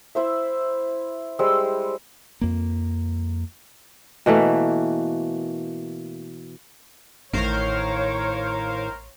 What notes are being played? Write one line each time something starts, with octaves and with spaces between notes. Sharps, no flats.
E4 C5 E5
G3 G#3 C5 E6
F2 A#3
B2 E3 A3 A#3
A1 A2 D#3 A#4 C5 C#5 F5